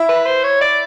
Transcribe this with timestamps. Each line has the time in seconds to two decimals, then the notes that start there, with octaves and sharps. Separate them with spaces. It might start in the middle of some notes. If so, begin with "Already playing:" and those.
Already playing: E4 E5
0.09 B4
0.26 C5
0.43 C#5
0.61 D5